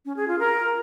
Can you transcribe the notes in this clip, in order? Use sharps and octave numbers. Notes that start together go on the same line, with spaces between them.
C#4
G#4
F4
A#4